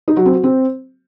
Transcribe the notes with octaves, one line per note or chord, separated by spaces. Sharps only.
D#4
F#3
C4
F#4
C4